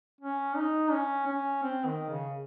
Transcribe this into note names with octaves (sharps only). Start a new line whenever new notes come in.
C#4
D#4
C#4
C#4
C4
D#3
C#3